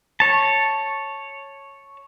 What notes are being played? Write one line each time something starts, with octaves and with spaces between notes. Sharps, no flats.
C#5 A5